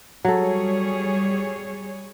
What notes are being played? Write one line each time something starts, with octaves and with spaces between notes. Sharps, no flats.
F#3 G3 G#4 A4 C#5